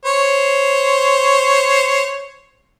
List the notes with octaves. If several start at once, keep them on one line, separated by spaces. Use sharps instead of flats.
C5 C#5